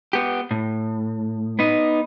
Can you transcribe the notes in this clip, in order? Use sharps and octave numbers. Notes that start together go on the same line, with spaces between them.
B3 G4
A2
B3 D#4